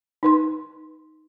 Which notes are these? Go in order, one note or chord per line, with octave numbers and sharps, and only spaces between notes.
D#4 B4 C6